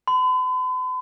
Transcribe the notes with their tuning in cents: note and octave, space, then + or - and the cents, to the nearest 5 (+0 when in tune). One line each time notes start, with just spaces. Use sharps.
B5 +45